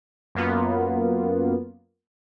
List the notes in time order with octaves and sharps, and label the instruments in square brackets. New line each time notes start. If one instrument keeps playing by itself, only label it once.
[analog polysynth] F#2 A#3 B3 F4